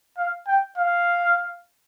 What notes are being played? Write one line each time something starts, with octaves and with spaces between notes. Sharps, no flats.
F5
G5
F5